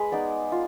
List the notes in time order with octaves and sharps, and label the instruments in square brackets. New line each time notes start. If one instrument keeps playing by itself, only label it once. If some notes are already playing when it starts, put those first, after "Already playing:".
Already playing: [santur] G#3 G#4 B4
B3 D#4 D5
F4